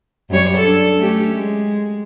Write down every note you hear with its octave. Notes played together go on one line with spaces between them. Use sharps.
F#2 G3 C#5
D4 A4
A3 C#4 G4
G#3